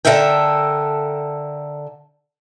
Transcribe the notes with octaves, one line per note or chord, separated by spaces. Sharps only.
D3 A4 A#4 E5 G5